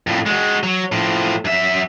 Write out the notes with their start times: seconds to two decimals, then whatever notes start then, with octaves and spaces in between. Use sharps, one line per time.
0.07 F2 A2
0.26 G#3 F#4
0.63 F#3
0.92 A2 F3
1.45 F#2 E5